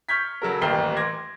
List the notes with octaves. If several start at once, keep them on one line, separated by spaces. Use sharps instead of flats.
C#6 F6 G6 G#6 B6
C#3 F#3 A4 A#4
D#1 A1 D#2 G5 C7 G7
C6 D6 G#6 A#6